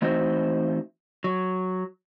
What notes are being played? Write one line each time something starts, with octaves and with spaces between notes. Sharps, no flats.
E3 A3 C4 D#4 F#4 C5
F#3